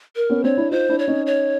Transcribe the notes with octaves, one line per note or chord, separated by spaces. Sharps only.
A#4
B3 C#4
C4 D4 C#5
D4 E4
D#4 F4 C5
D4 E4
C#5
C#4 D#4
C#5